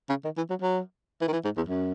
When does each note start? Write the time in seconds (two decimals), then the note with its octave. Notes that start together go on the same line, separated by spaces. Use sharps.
0.09 C#3
0.25 D#3
0.37 E3
0.50 F#3
0.62 F#3
1.22 E3
1.28 D#3
1.33 E3
1.45 G#2
1.57 E2
1.69 F#2